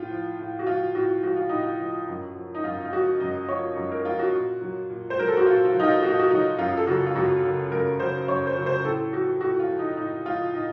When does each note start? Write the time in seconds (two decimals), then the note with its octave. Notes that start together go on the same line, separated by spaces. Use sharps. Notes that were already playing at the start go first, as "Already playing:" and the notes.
Already playing: A2 F4
0.10 F3
0.39 A2
0.59 F#4
0.67 F3 F4
0.95 A2 F#4
1.23 F3 F#4
1.36 F4
1.49 A2 D#4
1.62 F4
1.80 F3
2.08 F#2
2.36 F3
2.54 D#4
2.64 F#2 F4
2.85 F4
2.92 F3 F#4
3.20 F#2 D#5
3.49 F3 C#5
3.76 F#2
3.92 A#4
4.05 F3 F4
4.19 F#4
4.34 A#2
4.62 F#3
4.90 A#2
5.10 C5
5.18 F#3 A#4
5.28 A4
5.37 F#4
5.46 A#2 F4
5.65 F4
5.74 F#3
5.80 D#4
5.83 F4
6.02 A#2 F#4
6.10 F4
6.19 F#4
6.31 F#3 D#4
6.58 F#2 F4
6.77 A4
6.87 C#3 F#3 F#4
7.06 F4
7.15 F#2 F#4
7.43 C#3 F#3
7.72 F#2 A#4
8.00 C#3 F#3 C5
8.28 F#2 C#5
8.47 C5
8.56 C#3 F#3
8.66 C5
8.84 A2 A4
9.12 F3 F#4
9.41 A2 F#4
9.59 F4
9.70 F3
9.79 D#4
9.97 A2 D#4
10.26 F3 F4
10.53 A2 D#4